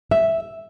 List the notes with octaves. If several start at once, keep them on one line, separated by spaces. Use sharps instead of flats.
E5